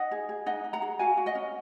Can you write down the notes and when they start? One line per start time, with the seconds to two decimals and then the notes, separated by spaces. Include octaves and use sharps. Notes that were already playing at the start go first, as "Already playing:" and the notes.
Already playing: D#4 D#5 F#5
0.11 G#4
0.29 G#4
0.46 D#4 D#5 F#5
0.64 D#4
0.73 F#5 A#5
0.82 G#4
0.99 F#4 F5 G#5
1.17 F#4
1.26 D#5 F#5
1.35 C#4